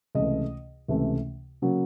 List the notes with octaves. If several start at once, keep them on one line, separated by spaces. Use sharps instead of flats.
C#2 C3 E3 A3 D#5
C#2 C3 E3 A3
C#3 F#3 A#3